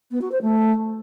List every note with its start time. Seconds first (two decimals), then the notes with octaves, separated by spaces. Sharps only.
0.11 B3
0.21 F#4
0.31 C5
0.42 A3